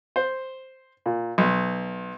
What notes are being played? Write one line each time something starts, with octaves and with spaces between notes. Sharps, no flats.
C5
A#2
B1